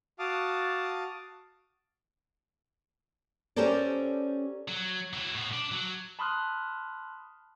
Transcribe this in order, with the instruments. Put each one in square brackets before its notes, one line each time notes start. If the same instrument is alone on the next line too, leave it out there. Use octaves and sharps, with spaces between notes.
[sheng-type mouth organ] F#4 F5 A5 D6 D#6
[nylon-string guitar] C#4 G4 A4 A#4 C5 D5
[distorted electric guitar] F#3
F#3 E4
A2 B3
D4
F#3
[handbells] A5 B5 C6 D#6 F6 F#6